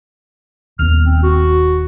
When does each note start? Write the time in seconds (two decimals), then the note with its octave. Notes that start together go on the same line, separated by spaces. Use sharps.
0.79 D#1 D#2 B3 F6
1.04 C4
1.23 F#4